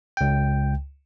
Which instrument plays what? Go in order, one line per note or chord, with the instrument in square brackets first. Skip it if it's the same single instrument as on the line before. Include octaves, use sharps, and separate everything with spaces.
[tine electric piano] C#2 G5